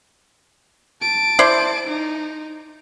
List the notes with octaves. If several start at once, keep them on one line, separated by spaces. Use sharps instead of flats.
A5 D7
E4 C5 D5
D#4